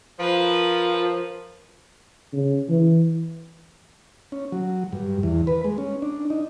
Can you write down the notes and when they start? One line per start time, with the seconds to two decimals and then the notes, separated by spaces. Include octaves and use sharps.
0.19 F3 A#4 B4
2.33 C#3
2.69 E3
4.32 C#4
4.52 F#3
4.93 G2
5.23 E2
5.47 B4
5.64 G#3
5.78 C#4
6.02 D4
6.30 D#4